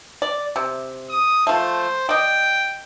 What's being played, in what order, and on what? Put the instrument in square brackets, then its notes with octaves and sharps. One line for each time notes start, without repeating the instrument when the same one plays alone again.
[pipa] D5
C3
[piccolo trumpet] D#6
[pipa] F3 A3 [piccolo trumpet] C5
[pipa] D5 D#5 [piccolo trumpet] G5